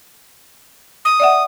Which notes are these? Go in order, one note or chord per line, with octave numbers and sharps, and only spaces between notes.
D#6
D5 E5 F#5